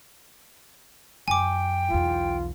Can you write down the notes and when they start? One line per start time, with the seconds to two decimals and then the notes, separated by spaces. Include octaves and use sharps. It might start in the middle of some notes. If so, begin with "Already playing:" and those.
1.28 F#2 G5 G#5 D6
1.90 B1 E2 F4